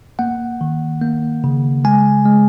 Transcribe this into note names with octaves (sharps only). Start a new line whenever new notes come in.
A#3 F#5
D#3
A#3
C#3
G#3 G#5
G#3